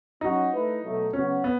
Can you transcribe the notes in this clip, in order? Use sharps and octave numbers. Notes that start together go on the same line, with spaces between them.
F#3 C#4 D#4 F#4
A3 E4 B4
B2 F#3 A3
C#3 F#3 B3 C#4 F#4
B3